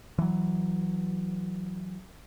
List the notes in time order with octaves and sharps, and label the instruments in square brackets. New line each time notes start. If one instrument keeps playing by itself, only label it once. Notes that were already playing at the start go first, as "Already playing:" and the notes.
[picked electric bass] E3 F#3